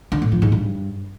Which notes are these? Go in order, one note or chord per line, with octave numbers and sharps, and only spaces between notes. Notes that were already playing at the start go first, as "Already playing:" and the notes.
D3
A2
F3
G#2
G2